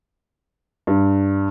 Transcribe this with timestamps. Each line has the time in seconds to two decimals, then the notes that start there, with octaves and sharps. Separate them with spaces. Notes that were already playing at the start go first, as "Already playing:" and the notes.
0.87 G2